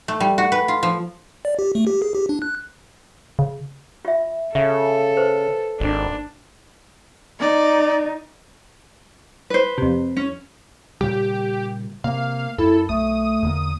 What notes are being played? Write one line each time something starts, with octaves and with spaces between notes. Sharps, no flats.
A3
G3
F#4
B4
F4
F3
D5
G4
A3
G4
G#4
G4
D4
F#6
C#3
F4 E5
C#3 A4 E5
B4 C5
G#1 D4
D#4 D5
B4 C5
F2 C3
C#4
A#2 C#3 G3 G4
C3 A#3 F5
F#2 E4 A4
B1 A3 D#6
E2 D3 A#3